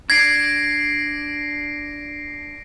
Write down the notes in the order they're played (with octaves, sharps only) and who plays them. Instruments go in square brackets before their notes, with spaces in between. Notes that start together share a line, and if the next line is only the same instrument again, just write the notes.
[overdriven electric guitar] D4 [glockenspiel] G#6 [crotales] A#6 C7 D7